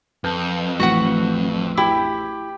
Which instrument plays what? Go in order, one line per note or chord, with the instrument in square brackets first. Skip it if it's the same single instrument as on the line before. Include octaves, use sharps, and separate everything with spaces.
[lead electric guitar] F2 [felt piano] B4 A5 G6
[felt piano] A1 A3 [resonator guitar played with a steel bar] F#4 B4 F#5
[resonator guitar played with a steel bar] E4 [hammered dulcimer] G4